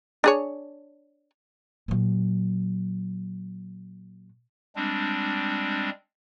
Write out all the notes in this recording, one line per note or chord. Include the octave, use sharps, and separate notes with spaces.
D4 G#4 C#5
A#2 F#3
G3 G#3 C4 D4